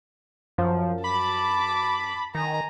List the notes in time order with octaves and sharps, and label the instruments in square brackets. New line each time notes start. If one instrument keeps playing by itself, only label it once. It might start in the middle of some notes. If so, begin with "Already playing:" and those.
[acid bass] F#2 [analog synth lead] F3
[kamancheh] A5 D6 [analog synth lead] B5
[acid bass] D#3 [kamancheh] G#5 A#5